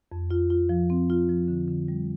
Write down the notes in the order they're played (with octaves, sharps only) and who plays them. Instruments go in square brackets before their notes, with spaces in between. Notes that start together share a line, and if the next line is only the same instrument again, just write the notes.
[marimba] F2
F4
F4
F3
C4
F4
F3
D3
D3
G3